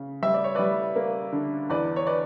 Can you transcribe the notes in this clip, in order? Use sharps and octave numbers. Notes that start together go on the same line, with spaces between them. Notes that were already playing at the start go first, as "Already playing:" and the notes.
Already playing: C#3
G3 E5
D5
C#5
G3 B4 D5
A#3
D3
E2 B4 D5
C#5
B4 D5